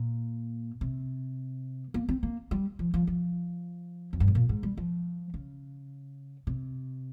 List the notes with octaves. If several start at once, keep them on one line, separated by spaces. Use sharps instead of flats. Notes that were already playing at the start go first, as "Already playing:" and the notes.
Already playing: A#2
C3
A#3
C4
A#3
G3
F3
F3
F3
F2
G2
G#2
A#2
G#2
G3
F3
C#3
C3